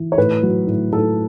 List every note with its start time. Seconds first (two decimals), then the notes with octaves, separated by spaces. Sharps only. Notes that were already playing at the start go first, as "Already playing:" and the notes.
Already playing: E3
0.12 C#5
0.18 A2 B4
0.43 F#3
0.67 A2
0.92 A2 A4